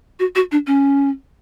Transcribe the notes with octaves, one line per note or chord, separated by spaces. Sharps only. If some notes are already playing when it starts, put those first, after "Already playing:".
F#4
F#4
D4
C#4